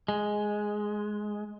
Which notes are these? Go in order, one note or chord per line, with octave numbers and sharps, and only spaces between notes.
G#3